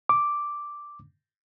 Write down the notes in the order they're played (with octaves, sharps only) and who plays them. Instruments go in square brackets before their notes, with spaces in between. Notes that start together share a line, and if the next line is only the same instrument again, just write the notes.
[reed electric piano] D6